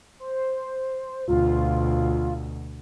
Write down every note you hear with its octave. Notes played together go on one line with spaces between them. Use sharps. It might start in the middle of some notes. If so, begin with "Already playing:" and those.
C5
D2 B2 F4